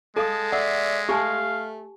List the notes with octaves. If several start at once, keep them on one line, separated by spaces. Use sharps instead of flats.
G#3 A4 F5 A5 D#6
D5 E5 F#5
A3 G4 F5 G#5 A5